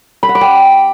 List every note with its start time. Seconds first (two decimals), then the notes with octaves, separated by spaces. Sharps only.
0.23 B5
0.29 F#5
0.35 D6
0.41 G5